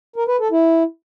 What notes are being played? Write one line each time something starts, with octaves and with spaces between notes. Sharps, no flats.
A#4
B4
A4
E4